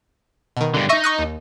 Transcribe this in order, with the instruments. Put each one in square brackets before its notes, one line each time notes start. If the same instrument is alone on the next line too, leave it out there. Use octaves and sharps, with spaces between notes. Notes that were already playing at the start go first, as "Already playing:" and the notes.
[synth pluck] B2 D#3
[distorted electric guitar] G2 D3
[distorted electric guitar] D#4 D#5 [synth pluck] E5 C#6
[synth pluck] C#6 D#6 F#6
D#2